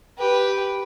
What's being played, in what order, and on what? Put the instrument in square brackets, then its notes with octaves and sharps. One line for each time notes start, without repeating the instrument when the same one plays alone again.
[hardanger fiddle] G4 B4